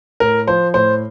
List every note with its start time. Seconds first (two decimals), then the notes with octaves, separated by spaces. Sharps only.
0.20 A2 A#4
0.47 F3 C5
0.74 A2 C5